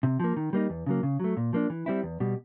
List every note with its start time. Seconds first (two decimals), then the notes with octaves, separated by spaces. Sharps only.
0.03 C3
0.20 F3 A#3
0.36 D#3
0.53 G3 A#3 D#4
0.70 E2
0.86 C#3 F#3 A#3
1.03 C#3
1.20 F#3 A3
1.37 A#2
1.53 F3 A#3 D4
1.70 E3
1.86 G3 C4 E4
2.03 E2
2.20 B2 G3